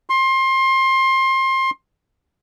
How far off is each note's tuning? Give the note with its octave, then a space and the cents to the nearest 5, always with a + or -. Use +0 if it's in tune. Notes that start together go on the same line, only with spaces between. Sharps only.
C6 +25